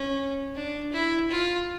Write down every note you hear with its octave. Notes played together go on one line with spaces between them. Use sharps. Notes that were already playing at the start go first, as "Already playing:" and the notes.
Already playing: C#4
D4
E4
F4